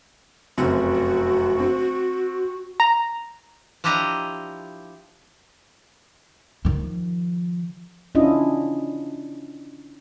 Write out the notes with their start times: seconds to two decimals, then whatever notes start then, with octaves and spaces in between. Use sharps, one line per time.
0.58 F1 F#2 C4 F#4
1.60 C4
2.80 A#5
3.84 F3 D4 E4 G4 D#5 A#5
6.65 D#3 F3
8.15 C#4 D4 E4 F4 D#5